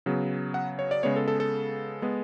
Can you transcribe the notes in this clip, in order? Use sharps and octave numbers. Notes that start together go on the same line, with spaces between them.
C#3 F#3 B3
F#5
C#5
D5
C#3 G#3 B3 C#5
A4
A4
A4
G#3 B3